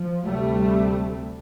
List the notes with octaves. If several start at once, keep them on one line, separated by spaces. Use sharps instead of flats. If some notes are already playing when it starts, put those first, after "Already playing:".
Already playing: F3
D2 C3 G3 A3